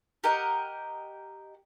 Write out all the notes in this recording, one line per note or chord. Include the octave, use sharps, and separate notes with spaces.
G4 A#4 D#5 F#5